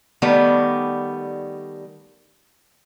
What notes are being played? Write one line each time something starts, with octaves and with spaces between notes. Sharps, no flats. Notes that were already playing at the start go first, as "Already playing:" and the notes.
D#3 G3 A3 B3 D5